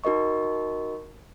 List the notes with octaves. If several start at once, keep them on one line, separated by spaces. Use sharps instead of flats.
D#4 F#4 A#4 D#5 C#6